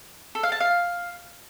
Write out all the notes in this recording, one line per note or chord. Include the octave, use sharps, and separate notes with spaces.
A4
F5
A5
F5